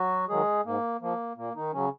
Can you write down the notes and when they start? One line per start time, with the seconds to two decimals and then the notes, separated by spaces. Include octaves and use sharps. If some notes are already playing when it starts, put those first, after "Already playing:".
Already playing: F#3 F#4
0.29 D#3 F#3 G#3 G#4
0.65 G#2 A#3
1.01 F3 A#3
1.37 A#2 A#3
1.55 D#3 D#4
1.73 C#3 F#3 C#4